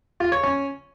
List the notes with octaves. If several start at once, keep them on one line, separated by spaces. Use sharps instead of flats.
F4
C#5
C#4